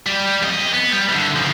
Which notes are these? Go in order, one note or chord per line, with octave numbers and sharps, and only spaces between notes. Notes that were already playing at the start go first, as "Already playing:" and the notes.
G3 G4
F2 D#5
B3
G3
D3 E3
C#3 F3